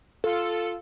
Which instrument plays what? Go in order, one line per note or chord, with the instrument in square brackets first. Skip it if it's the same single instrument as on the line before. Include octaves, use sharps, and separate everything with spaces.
[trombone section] F4 [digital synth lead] A4